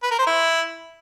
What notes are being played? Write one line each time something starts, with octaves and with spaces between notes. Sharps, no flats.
B4
A#4
C5
E4